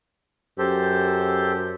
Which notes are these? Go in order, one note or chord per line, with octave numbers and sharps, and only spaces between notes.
F#2 G4 A4 C5